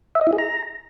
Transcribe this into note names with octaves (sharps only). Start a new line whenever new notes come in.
E5
D#5
E4
G#4
A#5